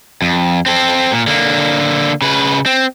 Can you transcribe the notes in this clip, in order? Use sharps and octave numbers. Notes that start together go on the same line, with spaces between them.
F2
C4 A4
A#2
D3 A#3
C#3 B4
C4